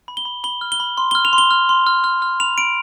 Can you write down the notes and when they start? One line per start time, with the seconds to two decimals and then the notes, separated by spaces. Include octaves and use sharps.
0.08 B5
0.17 G7
0.25 B5
0.44 B5 G7
0.61 F6
0.72 G7
0.80 B5
0.98 C6
1.11 F6 G7
1.25 F7
1.33 C6
1.38 G7
1.51 F6
1.69 C6
1.87 F6
2.04 F6
2.22 F6
2.40 B5 F7
2.58 B5 D7